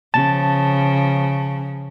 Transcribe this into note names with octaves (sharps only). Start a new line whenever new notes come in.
C#3 F3 A5